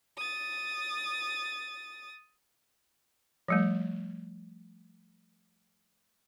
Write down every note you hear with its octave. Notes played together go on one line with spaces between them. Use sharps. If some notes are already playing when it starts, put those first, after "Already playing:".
D#6 A6
F3 G3 A3